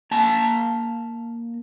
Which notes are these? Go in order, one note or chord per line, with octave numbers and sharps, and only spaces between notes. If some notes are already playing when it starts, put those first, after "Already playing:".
A#3 A5 A#5